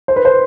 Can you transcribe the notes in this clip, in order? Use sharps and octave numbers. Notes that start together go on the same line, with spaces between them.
C5
B4
C5